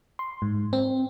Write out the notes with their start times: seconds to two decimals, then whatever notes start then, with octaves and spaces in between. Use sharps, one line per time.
0.19 C6
0.42 G#2
0.73 C4